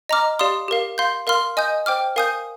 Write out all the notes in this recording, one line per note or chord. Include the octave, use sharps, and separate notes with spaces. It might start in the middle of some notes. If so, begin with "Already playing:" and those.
D#5 A#5 D6 F6
G4 D5 F5 C6 D#6
G4 A#4 F5
F5 C6 G6
A#4 F5 C6 F6
D#5 G#5 D#6 G6
C5 G5 D6 F6
A#4 F5 G#5 D#6 G6